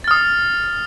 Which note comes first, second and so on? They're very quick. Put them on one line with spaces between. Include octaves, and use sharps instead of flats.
A6 F6 D#6